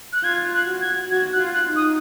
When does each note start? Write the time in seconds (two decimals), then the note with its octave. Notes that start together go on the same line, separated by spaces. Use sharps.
0.13 F#6
0.23 F4 G#6
0.54 F#6
0.68 F#4
0.81 G#6
1.10 F#4 G#6
1.33 F#6
1.39 F4
1.54 F#6
1.68 D#4
1.76 D#6